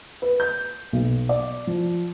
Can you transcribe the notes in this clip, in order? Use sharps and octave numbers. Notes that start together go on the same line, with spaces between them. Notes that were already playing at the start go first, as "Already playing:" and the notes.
B4
G6
B1
D5
F3